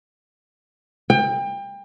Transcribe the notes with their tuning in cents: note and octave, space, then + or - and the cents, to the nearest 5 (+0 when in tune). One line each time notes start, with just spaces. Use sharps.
G5 +30